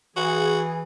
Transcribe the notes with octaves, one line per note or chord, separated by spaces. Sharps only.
E3 F#4 G#4